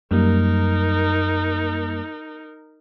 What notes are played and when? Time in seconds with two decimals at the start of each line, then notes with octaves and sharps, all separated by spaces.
0.11 F#2 G3 A#3 D#4 A#4